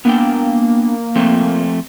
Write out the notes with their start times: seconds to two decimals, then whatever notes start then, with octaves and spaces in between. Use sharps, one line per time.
0.05 A#3 B3 D4 G5
1.15 F3 A3 C4